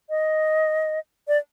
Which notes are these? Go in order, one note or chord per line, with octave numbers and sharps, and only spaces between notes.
D#5
D5